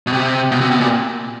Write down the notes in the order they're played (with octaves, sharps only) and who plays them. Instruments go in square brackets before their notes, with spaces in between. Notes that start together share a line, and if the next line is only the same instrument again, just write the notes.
[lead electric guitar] B2
C3
B2
C3
B2
A#2